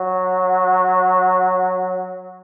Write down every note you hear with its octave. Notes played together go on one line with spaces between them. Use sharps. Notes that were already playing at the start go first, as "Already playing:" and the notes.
Already playing: F#3